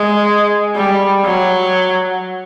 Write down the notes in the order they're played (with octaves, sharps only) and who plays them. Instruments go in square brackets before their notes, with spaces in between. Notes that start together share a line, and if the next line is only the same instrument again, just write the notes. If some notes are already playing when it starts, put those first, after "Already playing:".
Already playing: [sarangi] G#3
G3
F#3